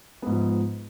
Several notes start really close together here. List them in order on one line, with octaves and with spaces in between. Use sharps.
B3 G#2 F3